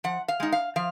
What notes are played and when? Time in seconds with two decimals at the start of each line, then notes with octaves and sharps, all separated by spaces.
0.04 F3 F#5
0.28 F5
0.40 G#3 D#4
0.52 F5
0.76 F3 F5